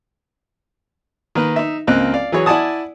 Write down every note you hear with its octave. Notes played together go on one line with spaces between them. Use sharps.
D#3 A#3 B4
D#4 E5
C#2 A#3 C4 A#4 D#5 F#6
D5 F5
E3 F#3 G#4 C#5
E4 D5 F#5 G#5 A5 D#6